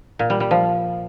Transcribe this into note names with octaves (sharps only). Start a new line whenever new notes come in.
A#2
G3
G3
F3